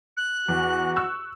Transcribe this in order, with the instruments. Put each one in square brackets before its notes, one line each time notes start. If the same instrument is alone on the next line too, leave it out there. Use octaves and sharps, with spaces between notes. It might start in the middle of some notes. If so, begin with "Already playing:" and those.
[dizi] F#6
[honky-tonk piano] E2 [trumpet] F#4
[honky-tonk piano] C#6 E6 F#6